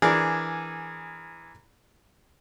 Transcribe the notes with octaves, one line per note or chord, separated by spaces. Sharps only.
E3 D4 G#4 A#4